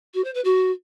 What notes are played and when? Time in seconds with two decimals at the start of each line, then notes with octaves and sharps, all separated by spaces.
0.14 F#4
0.24 C5
0.34 B4
0.45 F#4